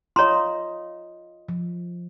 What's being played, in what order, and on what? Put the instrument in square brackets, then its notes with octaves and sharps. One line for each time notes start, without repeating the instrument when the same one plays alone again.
[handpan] F4 D#5 [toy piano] C#5 A#5 C6
[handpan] F3